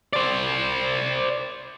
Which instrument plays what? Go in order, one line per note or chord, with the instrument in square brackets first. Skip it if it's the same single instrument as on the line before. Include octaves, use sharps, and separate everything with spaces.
[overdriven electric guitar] C5 D5